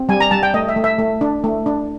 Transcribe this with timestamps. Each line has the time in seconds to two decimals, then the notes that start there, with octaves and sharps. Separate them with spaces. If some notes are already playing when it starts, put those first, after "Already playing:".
Already playing: C4
0.09 G3 G#5
0.20 A#5
0.31 G3 A5
0.43 G5
0.54 A3 D#5
0.69 E5
0.76 A3
0.84 E5
0.99 A3
1.21 D4
1.44 A3
1.66 D4